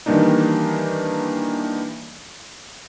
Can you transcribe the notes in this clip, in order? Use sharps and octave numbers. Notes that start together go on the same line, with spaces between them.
D#3 E3 G3 A#3 D4 D#4